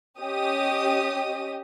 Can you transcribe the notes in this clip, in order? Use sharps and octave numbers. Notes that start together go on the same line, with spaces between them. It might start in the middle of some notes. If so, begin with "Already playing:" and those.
C#4 G4 D#5 D#6